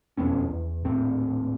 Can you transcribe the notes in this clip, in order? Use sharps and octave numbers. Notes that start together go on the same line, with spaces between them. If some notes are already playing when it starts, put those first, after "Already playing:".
E1 F2 B3 C#4
E2
D#1 A2 C4